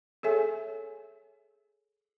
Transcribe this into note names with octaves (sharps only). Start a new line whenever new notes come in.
G#4 A4 C#5 E5 G#5